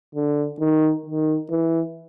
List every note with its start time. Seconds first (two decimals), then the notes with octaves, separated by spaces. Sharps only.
0.15 D3
0.60 D#3
1.06 D#3
1.50 E3